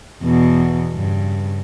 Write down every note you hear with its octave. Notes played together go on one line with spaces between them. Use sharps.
E2 B2
G2 C#3